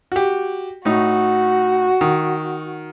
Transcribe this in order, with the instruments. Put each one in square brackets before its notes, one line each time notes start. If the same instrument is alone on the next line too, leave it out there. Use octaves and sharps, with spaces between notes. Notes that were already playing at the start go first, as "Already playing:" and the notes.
[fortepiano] F#4 G4
[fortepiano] A2 D#4 [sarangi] F#4
[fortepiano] D#3